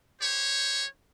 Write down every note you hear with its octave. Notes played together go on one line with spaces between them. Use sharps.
G4 C5 C#5